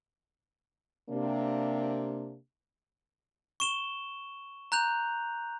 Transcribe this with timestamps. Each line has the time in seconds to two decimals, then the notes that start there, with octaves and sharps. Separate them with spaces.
1.10 C3 A#3 D4
3.60 C#6 E7 G7
4.72 A#5 F#6 G6 F7